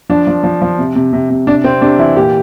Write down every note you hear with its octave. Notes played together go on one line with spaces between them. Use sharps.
F3 D4
F3
F3
F3
C3
C3
C3
C3
C3 D4
C3 C4
C3 D4
E3 E4
A#2 G4